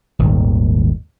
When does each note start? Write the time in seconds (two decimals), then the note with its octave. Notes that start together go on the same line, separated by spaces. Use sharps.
0.19 D#1 G#1 D#2